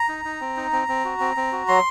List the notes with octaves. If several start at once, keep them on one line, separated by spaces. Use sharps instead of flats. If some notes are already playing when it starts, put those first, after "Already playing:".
Already playing: A#5
D#4
D#4
C4
D#4
C4
C4
F#4
C4
C4
F#4
F#3 C6